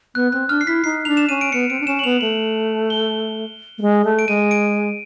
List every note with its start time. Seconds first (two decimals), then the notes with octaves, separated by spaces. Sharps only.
0.15 B3 F#6
0.32 C4 F#6
0.49 D4 F6
0.61 C7
0.67 E4 B6
0.84 D#4 C7
1.05 D4 F7
1.17 E7
1.29 C#4 D#7
1.41 D7
1.52 B3 C#7
1.69 C4 D7
1.80 D4
1.87 C#4 E7
1.99 F#7
2.04 B3 F7
2.21 A3 F#7
2.90 G7
3.78 A3
3.82 G#3
4.05 A3
4.19 D7
4.28 G#3 D#7
4.51 D7